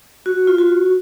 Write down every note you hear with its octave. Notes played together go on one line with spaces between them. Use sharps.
F#4
F4
F#4